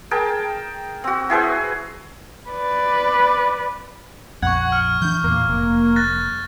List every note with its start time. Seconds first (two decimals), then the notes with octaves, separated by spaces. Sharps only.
0.11 G#4 A#4 G5 A5
1.04 C4 F#4
1.30 E4 G#4 B4 C5
2.50 B4 D5
4.42 A#1 F2 F#5 C#6 G#6
4.72 F6
5.02 E3 D4 G6
5.24 E2 A#2 A#3
5.48 F1
5.96 F#6 A6 A#6